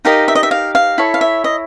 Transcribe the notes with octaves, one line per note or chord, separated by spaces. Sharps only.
D#4 G4 A#4 D#5 F5
E5
D#5
E5
F5
F5
E4 A4 C#5
F5
E5
D#5